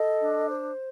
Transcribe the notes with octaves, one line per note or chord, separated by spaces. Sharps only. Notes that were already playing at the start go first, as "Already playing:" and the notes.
Already playing: A4 D#5
D4
C5